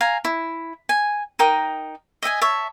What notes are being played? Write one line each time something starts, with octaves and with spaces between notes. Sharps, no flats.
F5 G#5 A#5
E4
G#5
D#4 A#4 G5 D#6
D#5 E5 G5 G#5
C#5 E5 A5